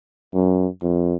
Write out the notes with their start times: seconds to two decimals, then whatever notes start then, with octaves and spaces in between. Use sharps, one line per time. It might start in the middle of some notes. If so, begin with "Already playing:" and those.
0.34 F#2
0.82 F2